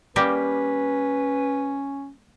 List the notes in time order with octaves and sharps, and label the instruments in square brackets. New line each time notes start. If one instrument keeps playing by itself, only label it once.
[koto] G3 A#3 G4 [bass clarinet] C#4 [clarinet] B4